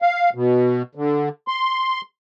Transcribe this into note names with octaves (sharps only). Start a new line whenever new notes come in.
F5
B2
D3
C6